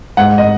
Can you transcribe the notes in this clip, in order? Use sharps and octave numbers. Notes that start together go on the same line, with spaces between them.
G#2 F#5
D#5